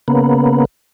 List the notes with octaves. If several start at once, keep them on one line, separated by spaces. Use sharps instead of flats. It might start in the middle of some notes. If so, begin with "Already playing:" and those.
C#3 A#3 B3